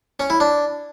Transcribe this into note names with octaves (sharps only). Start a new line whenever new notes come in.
C#4
E4
D4